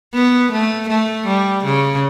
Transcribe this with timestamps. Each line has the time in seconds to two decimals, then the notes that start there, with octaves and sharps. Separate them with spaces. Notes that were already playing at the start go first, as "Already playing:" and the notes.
0.14 B3
0.52 A3
0.89 A3
1.27 G3
1.64 C#3